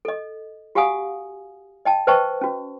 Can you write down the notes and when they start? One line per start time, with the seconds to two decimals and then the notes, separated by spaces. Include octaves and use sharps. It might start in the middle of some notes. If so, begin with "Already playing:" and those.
0.05 A4 D#5
0.75 F#4 G4 F5 F#5 G#5 D#6
1.85 D#5 G5 A5
2.07 B4 C5 D#5 G5 A5 C#6
2.41 C#4 F#4